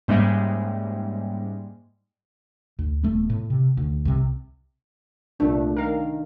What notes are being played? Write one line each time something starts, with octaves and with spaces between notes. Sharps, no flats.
G#2 G3 G#3 A#3 C#4 E5
D2
D#1 A3 B3
A2
C3
D2
C2 C3
C2 A#2 A3 D4
D#3 A#4 F5